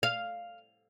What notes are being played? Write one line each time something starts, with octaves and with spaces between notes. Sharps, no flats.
F5